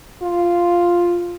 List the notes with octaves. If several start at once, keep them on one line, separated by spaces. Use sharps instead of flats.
F4